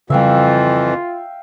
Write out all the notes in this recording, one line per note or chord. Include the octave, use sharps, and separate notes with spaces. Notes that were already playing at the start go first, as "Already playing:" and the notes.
F2 C#3 E3 G3 F4 E5 F5 G5